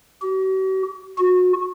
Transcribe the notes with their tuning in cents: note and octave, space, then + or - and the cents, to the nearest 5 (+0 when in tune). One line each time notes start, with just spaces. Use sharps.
F#4 +45
F#4 -30